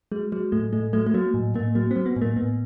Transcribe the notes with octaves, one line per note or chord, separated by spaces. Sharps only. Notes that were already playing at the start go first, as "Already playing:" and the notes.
F#3 G#3
F#3 G#3
A2 A3
A2 A3
F#3 A3
A3
F#3 A#3
A2
A2 A#3
F#3 A#3
C4
F#3
B3
A2
A#3
A2 B3